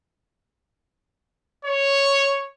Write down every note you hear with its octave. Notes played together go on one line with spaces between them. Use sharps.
C#5